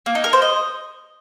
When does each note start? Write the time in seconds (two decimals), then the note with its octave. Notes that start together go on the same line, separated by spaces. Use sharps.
0.06 A#3
0.15 D#4
0.24 A#4
0.33 C5
0.42 D#5